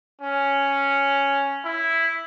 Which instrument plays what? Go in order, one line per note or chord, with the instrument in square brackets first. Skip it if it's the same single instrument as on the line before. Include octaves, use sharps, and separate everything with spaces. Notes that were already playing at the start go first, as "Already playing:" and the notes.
[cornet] C#4
E4